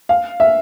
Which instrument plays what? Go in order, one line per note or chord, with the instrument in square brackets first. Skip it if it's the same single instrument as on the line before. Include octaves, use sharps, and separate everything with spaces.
[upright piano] F5
E5